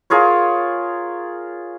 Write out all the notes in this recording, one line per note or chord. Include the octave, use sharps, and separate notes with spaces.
F4 G#4 A#4 C#5